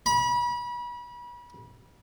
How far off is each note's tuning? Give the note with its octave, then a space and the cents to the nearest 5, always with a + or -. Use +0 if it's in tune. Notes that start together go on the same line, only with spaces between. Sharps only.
B5 -35